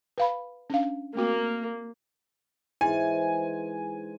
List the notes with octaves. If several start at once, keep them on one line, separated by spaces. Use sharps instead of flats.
B4 F5 B5
C#4 D4 F5
A3 A#3 C4 F#4
G#2 E3 E4 C5 G#5